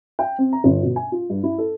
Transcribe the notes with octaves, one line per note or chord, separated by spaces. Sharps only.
G5
C4
A#5
G1
B2
G#5
F4
G2
E4
A4